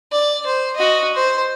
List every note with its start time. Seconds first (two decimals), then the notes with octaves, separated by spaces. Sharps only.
0.12 D5
0.46 C5
0.76 F#4 D#5
1.14 C5